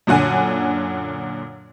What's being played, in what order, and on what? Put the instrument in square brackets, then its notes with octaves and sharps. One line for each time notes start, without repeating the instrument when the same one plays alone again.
[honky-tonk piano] F#2 A#2 D3 F#5 G#5